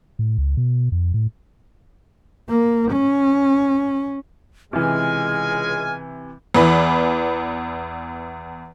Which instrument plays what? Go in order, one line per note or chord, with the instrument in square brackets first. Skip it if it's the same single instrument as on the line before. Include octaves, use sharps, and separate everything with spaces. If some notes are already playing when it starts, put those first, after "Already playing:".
[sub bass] A2
C#2
B2
F2
A2
[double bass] A#3
C#4
[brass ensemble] C#2 G#3 G#5 [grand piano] C3 E3 [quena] F6
[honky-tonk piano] E2 E3 B5